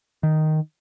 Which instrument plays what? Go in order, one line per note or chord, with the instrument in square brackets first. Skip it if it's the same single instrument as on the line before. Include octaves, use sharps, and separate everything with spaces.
[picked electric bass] D#3